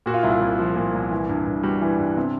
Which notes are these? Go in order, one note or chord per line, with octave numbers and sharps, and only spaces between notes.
A#2 F#4
F4
C2 E4
F4
C2
F3
A#2
C2
E3
G2
G2
G3 F#4
E3
G2
C3